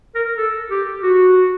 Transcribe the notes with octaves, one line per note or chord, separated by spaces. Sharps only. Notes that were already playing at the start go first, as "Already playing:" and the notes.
A#4
A4
G4
F#4